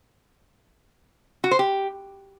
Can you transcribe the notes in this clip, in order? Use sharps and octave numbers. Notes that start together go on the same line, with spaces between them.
F#4
C5
G4